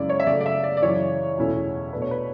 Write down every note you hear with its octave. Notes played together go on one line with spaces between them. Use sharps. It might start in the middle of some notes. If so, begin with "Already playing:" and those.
Already playing: F#2 C#3 G#3 C#4 E4 D5
C#5
E5
C#3 F#3 A3 D5
D5
E5
D5
D5
F#2 C#3 E3 C#5
E2 B2 A3 C#4 E4
B2 A3 D4 B4
C#5
B4